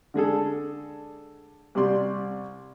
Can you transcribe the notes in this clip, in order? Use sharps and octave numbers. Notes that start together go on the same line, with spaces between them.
D3 G#3 G#4 A4
C2 C3 D5 C6